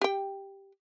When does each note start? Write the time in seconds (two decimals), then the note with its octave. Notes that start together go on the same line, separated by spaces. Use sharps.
0.02 G4 G5